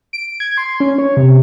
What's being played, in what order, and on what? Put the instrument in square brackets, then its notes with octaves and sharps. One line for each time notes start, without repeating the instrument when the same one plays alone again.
[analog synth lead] D7
G#6
C6
C#4
C#5
C3